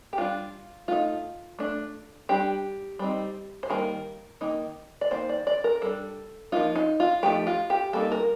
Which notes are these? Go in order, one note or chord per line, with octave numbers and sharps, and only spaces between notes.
G4
G3 D4 F4
A3 D#4 F4
A3 D4
G3 D4 G4
G3 C4 D#4
C5
D#3 G3 A#3 A#4
D#3 A#3 D#4
D5
D#3 A#3 D#4 C5
D5
D5
A#4
G3 D4 A4
F3 A#3 D#4 F4
D#4
F4
F3 A3 D#4 G4
F4
G4
G3 A#3 D#4 A4
A#4